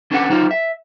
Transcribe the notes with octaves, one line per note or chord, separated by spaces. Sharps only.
C#4 D4 G4 B4 F5 F#5
F#3 D#4 F4 C5
E5